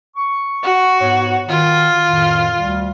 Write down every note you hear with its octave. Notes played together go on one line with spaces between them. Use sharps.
C#6
F#4
G#2 B3 C#5
D#3 F4
F2 A2 D#3
D2 G3